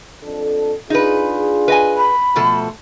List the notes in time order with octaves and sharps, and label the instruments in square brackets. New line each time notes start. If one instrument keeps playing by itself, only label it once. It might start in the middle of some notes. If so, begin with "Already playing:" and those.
[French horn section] F2 D4 A4
[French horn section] D4 F4 G#4 [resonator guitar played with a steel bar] D#4 B4
[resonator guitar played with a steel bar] B4 D#5 G#5
[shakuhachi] B5
[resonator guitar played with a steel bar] B2 F3 A4 [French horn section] A3